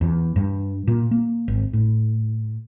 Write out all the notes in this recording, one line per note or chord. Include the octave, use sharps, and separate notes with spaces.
E2
G2
A#2
A#3
G#1
A2